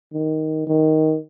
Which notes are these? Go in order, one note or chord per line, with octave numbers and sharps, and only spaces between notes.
D#3
D#3